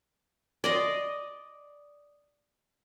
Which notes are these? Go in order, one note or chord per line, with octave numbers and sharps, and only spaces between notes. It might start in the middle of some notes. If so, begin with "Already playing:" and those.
D5 D#5 C6